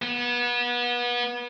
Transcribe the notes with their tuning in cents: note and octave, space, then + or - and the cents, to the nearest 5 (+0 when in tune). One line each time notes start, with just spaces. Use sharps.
B3 -30